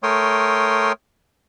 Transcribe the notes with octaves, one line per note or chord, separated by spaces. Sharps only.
A3 A#4 C#5 G5 C6 D#6